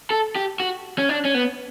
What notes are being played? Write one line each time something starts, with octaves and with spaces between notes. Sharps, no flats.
A4
G4
F#4
C#4
D4
C#4
B3